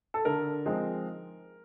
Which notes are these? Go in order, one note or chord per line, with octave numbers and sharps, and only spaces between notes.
A4
D3 A#4
F3 G#3 C4 D#4